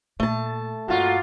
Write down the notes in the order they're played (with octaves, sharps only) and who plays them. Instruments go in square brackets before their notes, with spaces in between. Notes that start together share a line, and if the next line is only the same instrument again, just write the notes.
[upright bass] A#2 [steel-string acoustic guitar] A3 A5
[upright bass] G2 [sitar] A#2 F4 [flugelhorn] F#4